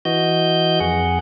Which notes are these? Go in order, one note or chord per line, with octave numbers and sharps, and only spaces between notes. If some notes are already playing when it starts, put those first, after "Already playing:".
E3 F#4 D#5 G6
F2 G#4 F#5